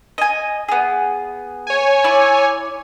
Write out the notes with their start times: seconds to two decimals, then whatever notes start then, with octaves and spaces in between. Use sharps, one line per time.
0.18 D#5 G#5
0.68 B3 G#4
1.67 C#5 G#5
2.04 E4 D5